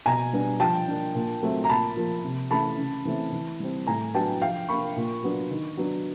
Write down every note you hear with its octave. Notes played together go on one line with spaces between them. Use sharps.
B2 G#5 A#5
G3 B3 D4
F3 G5 A5
A#3 D4
A#2
F#3 A3 C4
A#5
A#2 A5 B5
F3 A#3
C3
E3 A3 C#4 A5 B5
C#3
E3 A3 C4
E3
G3 C4
A2 G#5 A#5
F#3 B3 D4 G5 A5
F3 F5 G5
A#3 D4 B5 C#6
A#2
F#3 B3 D4
D#3
F#3 B3 D4